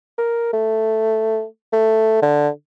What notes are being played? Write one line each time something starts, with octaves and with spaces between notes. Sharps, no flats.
A#4
A3
A3
D3